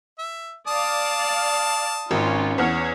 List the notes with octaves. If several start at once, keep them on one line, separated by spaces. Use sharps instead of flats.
E5
D5 F5 A5 D#6
G#1 C#4 F4
E2 C#5 F#5 F6